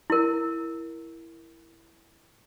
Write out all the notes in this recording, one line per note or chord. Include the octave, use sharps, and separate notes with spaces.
E4 A#4